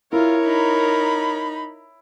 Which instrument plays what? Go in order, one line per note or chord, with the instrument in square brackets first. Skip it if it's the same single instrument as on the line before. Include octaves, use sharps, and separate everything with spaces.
[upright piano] E4 [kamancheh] F4 [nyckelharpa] A#4 C#5
[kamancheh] D#4 B5